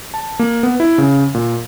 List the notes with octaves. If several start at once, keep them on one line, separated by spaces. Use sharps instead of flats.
A5
A#3
B3
E4
C#3
A#2